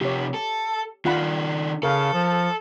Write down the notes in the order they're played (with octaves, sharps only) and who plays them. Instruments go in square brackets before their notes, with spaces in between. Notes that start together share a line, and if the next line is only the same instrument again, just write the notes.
[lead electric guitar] C3 F3 [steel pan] G4 C#5
[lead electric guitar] A4
[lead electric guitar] D#3 D4 [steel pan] F4 F#5 B5
[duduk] C#3 [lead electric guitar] A4 [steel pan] A#4 F5
[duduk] F3